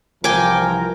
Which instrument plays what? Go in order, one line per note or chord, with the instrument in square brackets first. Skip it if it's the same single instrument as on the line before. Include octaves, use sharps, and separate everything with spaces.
[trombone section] C2 E3 F3 [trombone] A#4 [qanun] G5 G#5 D6